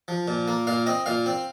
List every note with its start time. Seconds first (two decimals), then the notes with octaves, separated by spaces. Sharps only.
0.08 F3
0.28 A#2
0.48 A#3
0.67 A#2 F5
0.86 C4 D#5
1.06 A#2 F5
1.26 C4